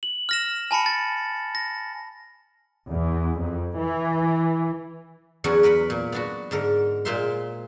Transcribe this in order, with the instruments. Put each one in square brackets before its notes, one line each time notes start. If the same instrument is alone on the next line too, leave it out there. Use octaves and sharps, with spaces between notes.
[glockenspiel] F#7
F6 A#6 E7
G#5 A5 B5 C#7
A6
A#6
[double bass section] E2
F2
E3
[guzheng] E2 F#3 C#4 D4 F#5
A#4 B4 F#5 B5
A#2
B3 D4 F#4
G#2 D3 A#4
A#2 G#3 A#3 C5 E5 C6